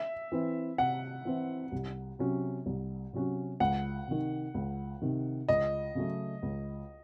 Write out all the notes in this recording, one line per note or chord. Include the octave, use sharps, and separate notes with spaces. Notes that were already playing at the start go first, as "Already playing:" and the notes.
Already playing: E5
E3 C4 E4
C3 F#5
E3 C4 E4
C2
C3 F#3 C#4 F#4
C2
C3 F#3 C#4 F#4
C#2 F#5
C3 D#3
C#2
C3 D#3
C#2 D#5
C#3 F#3 A3
C#2